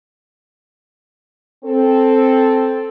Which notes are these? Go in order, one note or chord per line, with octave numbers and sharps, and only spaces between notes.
C4 A4